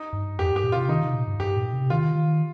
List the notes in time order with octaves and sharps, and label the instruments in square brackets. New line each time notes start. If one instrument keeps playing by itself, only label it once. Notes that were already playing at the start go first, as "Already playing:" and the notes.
Already playing: [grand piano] D#4
[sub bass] G2
[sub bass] F2 [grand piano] G4
[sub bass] G2 [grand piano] G4
[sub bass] A#2
[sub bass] C3 [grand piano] F4
[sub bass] D#3 [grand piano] D#4
[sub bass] C3
A#2
G2
[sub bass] G2 [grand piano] G4
[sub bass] A#2
C3
[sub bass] D#3 [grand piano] F4
[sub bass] D#3